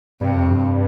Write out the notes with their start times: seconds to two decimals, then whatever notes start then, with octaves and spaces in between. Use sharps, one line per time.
0.21 G2 C3
0.35 F2
0.50 G2